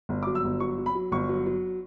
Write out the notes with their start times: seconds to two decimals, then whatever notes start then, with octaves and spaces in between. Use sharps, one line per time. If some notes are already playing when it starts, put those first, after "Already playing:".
0.09 G1
0.23 D6
0.26 F#3
0.35 E6
0.44 G1
0.60 F#3 C#6
0.78 F#3
0.86 B5
0.95 F#3
1.12 G1 C#6
1.29 F#3
1.46 F#3